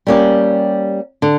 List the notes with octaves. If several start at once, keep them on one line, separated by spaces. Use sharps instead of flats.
G3 A#3 C#4 G4
D3